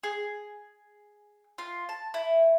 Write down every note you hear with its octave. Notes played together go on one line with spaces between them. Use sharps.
G#4
F4
A5
E4